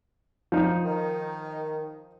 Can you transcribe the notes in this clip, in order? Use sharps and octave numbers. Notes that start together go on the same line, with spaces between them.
F3 D#4
D#3